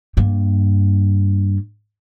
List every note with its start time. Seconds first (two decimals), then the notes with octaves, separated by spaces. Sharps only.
0.17 G2 A#3